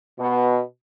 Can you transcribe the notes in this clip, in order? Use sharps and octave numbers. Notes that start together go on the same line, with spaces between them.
B2